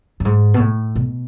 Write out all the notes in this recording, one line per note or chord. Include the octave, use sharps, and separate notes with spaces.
F#2
G#2
B2
A2
B2